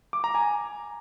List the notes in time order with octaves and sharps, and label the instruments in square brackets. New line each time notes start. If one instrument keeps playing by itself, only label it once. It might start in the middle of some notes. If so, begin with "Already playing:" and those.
[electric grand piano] D6
A#5
G#5